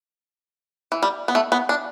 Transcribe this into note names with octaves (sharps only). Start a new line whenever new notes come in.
E3
G3
B3
A3
B3
D4